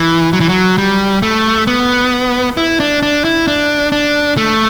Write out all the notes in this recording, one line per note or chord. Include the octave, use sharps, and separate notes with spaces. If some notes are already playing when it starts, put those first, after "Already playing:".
Already playing: E3
F#3
E3
F#3
G3
A3
B3
E4
D4
D4
E4
D4
D4
A3